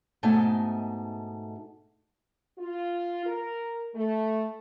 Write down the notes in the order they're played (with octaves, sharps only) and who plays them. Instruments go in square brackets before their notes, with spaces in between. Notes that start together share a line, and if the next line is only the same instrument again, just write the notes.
[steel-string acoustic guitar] G#2 B2 A3 D#4 G#5 A5
[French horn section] F4
A#4
A3